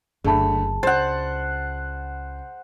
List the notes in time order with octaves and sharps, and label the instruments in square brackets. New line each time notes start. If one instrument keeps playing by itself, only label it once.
[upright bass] F#1 [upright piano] D3 A3 B5 [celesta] G#4 A5
[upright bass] C#2 [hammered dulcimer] C5 F#5 [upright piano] A6